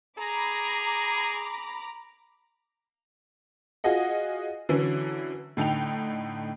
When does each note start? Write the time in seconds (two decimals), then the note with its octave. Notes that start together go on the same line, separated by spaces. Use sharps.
0.18 G#4 A#5 B5 D6
3.84 F4 F#4 G#4 D#5 F#5
4.69 D3 E3 F#3 C#4
5.57 A2 D3 D#4 G5 F7